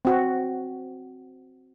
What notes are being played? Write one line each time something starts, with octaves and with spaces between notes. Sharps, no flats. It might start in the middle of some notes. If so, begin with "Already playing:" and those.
C4 F#4